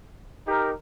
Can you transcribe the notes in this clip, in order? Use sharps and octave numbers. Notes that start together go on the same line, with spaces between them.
D#4 G4 A#4